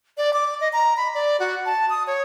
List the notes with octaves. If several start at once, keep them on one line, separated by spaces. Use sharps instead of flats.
D5
D6
D#5
A#5
B5
D5
F#4
A5
D#6
C#5